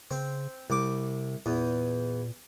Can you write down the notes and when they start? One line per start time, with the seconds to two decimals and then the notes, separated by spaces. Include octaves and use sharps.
0.11 C#3 C4
0.70 C2 C3 D6
1.46 E2 A#2